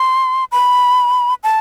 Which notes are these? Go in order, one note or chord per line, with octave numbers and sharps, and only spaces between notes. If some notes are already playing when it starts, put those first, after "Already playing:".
Already playing: C6
B5
A5